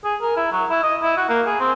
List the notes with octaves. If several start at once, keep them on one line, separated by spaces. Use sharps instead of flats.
G#4
A#4
E4
F#3
E4
D#5
E4
F#4
A#3
G#4
C4